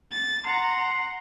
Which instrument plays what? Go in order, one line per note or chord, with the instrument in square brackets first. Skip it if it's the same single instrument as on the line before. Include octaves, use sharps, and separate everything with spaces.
[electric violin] A6
[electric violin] F#5 A#5 [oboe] C6